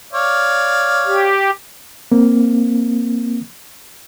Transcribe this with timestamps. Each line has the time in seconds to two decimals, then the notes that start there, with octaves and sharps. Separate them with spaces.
0.13 C#5 D5 F5
1.06 G4
2.12 A#3 C4